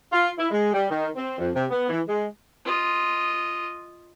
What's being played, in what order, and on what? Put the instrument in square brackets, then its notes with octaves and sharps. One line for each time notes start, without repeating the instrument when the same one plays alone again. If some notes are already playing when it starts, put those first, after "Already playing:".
[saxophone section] F4
E4
G#3
G3
D#3
C4
F2
C3
B3
E3
G#3
[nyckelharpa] F4 D#5